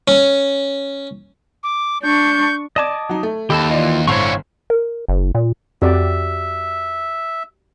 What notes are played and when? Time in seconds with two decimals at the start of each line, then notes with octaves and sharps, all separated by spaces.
0.08 C#4
1.63 D6
2.03 D4 C#6 G6
2.76 D5 D#5 A5 D6 G#6
3.09 F#3 D#4
3.23 A3
3.50 D#2 G4 A4 A5 B5
3.71 E3 F4 D5 D#5
4.08 G1 A2 D3 C#4 C5 C#5 F5 C#6
4.70 A#4
5.09 F#1
5.35 A#2
5.82 F2 F#4 G4 D5 E5